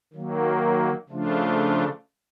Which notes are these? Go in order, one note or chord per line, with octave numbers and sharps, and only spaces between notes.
D#3 F#3 A#3
C#3 F3 A3 D4 F4